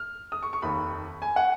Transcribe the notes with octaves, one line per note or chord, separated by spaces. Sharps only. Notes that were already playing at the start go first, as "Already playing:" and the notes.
Already playing: F6
D#6
C#6
C#6
F1 D#2 D#3 B5
G#5
F#5